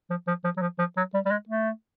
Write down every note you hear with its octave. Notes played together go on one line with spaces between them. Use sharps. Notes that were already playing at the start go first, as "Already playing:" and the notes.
F3
F3
F3
F#3
F3
F3
F#3
G3
G3
G#3
A3